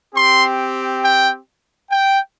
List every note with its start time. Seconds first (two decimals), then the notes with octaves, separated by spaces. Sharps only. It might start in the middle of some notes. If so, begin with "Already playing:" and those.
0.14 C4 G4 C6
1.02 G5
1.90 G5